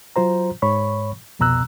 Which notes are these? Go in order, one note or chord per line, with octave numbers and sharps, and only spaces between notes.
F#3 F4 C5 A#5
G#2 C#5 B5 C#6
C2 F2 B2 A#5 E6 F#6